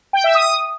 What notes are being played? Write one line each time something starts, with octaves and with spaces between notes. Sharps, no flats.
G5
E5
D#6